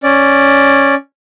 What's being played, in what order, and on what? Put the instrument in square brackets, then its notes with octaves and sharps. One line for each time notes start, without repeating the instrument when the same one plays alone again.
[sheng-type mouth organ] C#4 D5